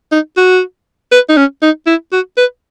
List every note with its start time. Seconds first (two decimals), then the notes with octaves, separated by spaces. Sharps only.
0.12 D#4
0.37 F#4
1.12 B4
1.29 D#4
1.37 C#4
1.62 D#4
1.87 E4
2.12 F#4
2.37 B4